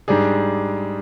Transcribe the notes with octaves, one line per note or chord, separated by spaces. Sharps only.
G#2 G3 D4 G#4